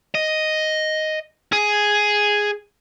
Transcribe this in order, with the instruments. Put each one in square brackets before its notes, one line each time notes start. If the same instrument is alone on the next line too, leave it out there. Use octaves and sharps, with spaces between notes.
[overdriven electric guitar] D#5
G#4